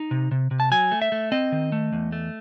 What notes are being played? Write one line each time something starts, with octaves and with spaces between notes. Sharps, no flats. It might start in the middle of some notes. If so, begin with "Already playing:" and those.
Already playing: D#4
C3
C3
C3
A5
F#3 G#5
A3
E5
A3
C4 D#5
D#3
A3
E2
A3